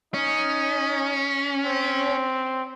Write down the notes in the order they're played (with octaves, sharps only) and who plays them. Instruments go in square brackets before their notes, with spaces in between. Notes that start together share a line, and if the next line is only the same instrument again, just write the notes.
[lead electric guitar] C#4 [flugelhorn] D#4
[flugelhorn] C4